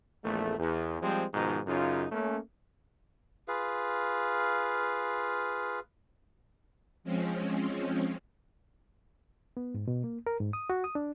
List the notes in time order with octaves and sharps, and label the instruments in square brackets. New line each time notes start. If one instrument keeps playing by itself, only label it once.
[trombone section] A#1 E2 A3
E2
F3 G3 G#3 C4
G#2 B2 D#3 F3 D#4
F#2 C#3 D#4 F4
A3 A#3 C#4
[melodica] F4 G#4 B4 F5
[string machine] F3 G#3 C4 C#4
[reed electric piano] B3
G#2
B2
A#3
A#4
G#2
D#6
F#4
D#6
D4